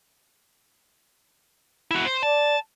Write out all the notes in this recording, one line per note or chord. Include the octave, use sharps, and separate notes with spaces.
E4 F#4
C5
D5 A5